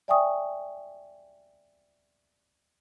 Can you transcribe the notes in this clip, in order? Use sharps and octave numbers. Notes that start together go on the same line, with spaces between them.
D5 E5 G5 G#5 C#6 D#6